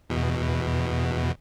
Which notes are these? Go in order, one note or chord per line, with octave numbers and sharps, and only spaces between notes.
E2 B2